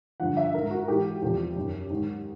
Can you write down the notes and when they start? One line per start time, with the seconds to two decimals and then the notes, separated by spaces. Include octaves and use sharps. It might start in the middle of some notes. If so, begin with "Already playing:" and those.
0.20 G2 D3 F3 F#5
0.37 E5
0.54 G#2 D#3 A#4
0.70 F#4
0.88 G#2 E3 G4
1.22 E2 C3 F3 G4
1.56 F#2 D#3
1.90 G#2 D#3